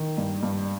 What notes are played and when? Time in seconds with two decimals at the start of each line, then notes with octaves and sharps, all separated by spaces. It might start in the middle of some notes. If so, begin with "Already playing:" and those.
Already playing: D#3
0.18 G2
0.43 G2